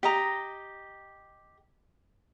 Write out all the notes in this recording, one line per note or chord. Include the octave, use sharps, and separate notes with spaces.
G4 D#5 A#5